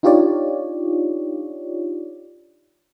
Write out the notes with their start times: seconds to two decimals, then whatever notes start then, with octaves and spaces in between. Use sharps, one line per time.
0.03 D4 D#4 F4 G4 C#5 D5